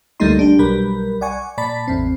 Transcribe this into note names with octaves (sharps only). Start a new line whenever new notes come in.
D2 G3 A3 A#3 D#4 C6
A#1 D4 G4
B1 F#3 G3 A#4 B5
D5 F#5 G#5 C#6
A#2 D5 A5 B5 A6 B6
A1 E2 C4